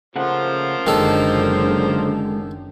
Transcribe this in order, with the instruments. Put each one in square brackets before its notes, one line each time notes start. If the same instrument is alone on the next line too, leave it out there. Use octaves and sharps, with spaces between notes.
[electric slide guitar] C#3 A3 F#5 [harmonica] F3 A#3 C5
[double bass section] F#1 D3 [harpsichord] D#3 A4 [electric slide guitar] G#3 C#4 D4